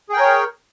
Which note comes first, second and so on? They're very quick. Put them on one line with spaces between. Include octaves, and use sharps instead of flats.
G#4 G5 A#4 C#5